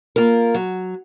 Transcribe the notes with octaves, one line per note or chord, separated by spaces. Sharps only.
A#3 F4 A#4
F#3